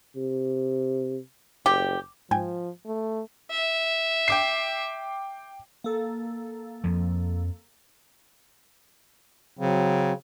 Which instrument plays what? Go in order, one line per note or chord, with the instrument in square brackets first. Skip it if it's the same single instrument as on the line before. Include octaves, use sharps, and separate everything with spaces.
[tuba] C3
[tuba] F#1 [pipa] G4
[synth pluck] G#2 G5 G#5 [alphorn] F3
[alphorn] A3
[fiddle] E5
[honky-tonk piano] G5 D6 C7
[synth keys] A#3 A4
[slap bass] F2 F3
[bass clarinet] C#3 [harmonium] F#3 C4